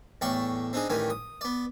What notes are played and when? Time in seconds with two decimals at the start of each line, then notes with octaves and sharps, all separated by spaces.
0.21 E2 A2 D5 G5 C#6
0.73 C4 D4 D#4 G#4
0.90 A1 D#3 E3 G3 G#5
1.10 D#6
1.41 B3 D5